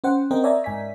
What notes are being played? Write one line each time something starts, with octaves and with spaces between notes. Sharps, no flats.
C#4 C5 F#5 G5
C4 A#4 D#5 G5
C#5 D5 E5 G#5 A#5
G#2 G#5 B6